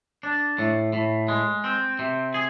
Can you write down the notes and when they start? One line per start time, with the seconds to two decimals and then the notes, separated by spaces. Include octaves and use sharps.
0.23 D4
0.58 A2
0.93 A2
1.28 G#3
1.64 C4
1.99 C3
2.34 G#4